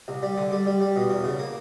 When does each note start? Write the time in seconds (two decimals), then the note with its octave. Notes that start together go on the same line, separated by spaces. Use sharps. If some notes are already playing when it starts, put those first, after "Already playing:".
0.08 C2
0.23 G3
0.37 D3
0.52 G3
0.66 G3
0.80 G3
0.96 B2
1.10 E2
1.24 C#3
1.39 A#3